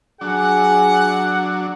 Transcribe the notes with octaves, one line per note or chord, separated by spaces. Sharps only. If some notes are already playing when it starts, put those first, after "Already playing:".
F#3 D4 G#4 F#5